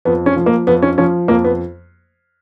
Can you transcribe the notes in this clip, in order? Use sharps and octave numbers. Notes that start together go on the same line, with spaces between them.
F2 B3
C#4
F3
A#3
F2 B3
C#4
F3 C#4
F2 A#3
B3